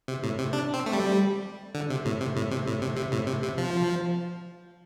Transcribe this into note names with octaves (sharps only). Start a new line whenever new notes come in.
C3
A2
C3
D4
C4
A3
G3
D3
C3
A2
C3
A2
C3
A2
C3
C3
A2
C3
C3
F3